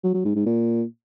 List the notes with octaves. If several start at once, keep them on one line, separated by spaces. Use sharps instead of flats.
F#3
F#3
G#2
G#2
A#2